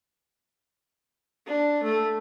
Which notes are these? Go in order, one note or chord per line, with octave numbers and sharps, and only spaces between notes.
D4
A3